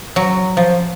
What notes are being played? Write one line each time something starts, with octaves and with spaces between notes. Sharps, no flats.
F#3
F3